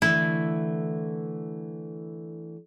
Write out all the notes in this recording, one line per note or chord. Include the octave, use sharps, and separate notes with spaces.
D3 E3 A3 E4